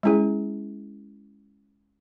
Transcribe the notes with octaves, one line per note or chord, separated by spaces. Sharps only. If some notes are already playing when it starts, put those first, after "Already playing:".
G#3 C#4 E4 G#4